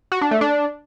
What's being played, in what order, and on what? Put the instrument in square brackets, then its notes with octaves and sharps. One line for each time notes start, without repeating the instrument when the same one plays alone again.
[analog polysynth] F#4
D4
A3
D4